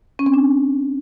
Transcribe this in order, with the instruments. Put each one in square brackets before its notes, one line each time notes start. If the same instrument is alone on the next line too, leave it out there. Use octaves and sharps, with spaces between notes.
[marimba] C#4
C4
D4